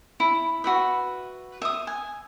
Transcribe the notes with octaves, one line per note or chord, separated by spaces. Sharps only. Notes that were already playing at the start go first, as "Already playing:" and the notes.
E4
F#4 B4 E5
E5 D#6
G#5